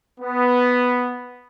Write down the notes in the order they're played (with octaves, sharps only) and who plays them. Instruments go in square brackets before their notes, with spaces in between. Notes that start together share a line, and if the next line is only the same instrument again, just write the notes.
[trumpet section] B3